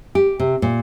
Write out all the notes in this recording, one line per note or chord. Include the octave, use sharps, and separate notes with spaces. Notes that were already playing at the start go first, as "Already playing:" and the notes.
G4
C3
A#2